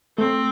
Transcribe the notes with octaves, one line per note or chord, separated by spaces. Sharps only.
A3 C4